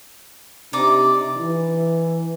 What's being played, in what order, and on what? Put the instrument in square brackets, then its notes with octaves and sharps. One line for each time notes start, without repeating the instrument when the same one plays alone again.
[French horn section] C3 D4 [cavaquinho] D#4 D5 D6
[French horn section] E3